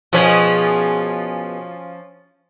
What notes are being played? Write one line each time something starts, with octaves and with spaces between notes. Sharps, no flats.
B2 F3 C#4 G#4